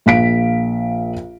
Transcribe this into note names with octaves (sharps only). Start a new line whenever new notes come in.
A#1 F5 B6 D7